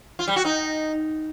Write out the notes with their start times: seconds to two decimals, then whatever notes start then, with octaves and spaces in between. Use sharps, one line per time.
0.19 F4
0.28 G3
0.36 F#4
0.45 D#4